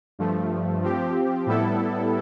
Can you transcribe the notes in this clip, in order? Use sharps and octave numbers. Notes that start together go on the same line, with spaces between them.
G2 F3 A3
F3 C4 G4
A2 G3 B3 E4 A4